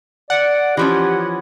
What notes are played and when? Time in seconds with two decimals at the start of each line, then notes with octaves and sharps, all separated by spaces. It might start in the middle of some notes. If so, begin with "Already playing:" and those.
0.30 D5 F#5
0.77 E3 F3 C#4 G4